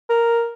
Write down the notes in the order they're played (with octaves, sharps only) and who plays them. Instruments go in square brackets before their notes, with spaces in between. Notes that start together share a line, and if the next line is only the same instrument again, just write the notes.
[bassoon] A#4